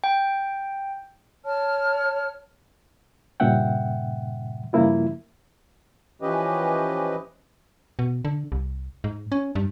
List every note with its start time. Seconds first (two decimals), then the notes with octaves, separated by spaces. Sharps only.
0.04 G5
1.44 C#5 A5 F6
3.40 G2 A#2 C#3 E5 F#5 G5
4.73 G2 C#3 F3 A#3 E4 F4
6.22 E3 F3 C#4 G4 B4 D#5
7.99 B2
8.25 D3
8.52 C2
9.04 G#2
9.32 C#4
9.55 G2